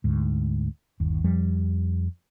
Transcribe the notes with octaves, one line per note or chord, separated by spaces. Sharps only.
D2 G#2
G1 D#2
F2 F3 G3